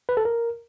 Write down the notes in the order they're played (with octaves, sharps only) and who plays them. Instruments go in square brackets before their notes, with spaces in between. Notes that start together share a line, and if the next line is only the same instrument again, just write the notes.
[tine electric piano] B4
A4
A#4